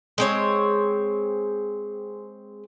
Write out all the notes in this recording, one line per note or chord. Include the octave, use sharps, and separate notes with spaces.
G#3 C4 C#5